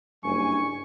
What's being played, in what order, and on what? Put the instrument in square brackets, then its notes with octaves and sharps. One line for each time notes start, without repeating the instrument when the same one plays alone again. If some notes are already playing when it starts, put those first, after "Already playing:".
[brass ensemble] F#1 G2 G#5 [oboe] C#6